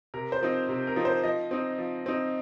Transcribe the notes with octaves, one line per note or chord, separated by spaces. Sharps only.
C3 A#4
C5
F3 C4 D#4
C3
A#4
F3 C4 D#4
C5
F3 D#5
C4 D#4
F3
C4 D#4